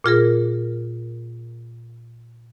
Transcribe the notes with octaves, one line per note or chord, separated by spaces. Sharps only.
A#2 F4 G#4 A#4